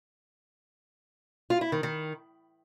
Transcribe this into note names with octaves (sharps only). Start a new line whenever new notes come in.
F4
E4
D#3
D#3